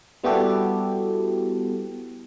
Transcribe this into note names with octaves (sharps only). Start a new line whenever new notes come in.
G3 B3 E4 F#4 G4 A4